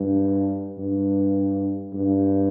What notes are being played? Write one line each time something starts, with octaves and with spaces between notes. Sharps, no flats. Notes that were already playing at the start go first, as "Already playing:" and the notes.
Already playing: G2
G2
G2